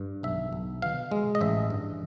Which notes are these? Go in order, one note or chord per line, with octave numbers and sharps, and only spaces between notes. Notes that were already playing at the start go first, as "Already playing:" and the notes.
Already playing: G2
B1 E5
B1
B2 F5
G#3
D#5
A1 E5
G2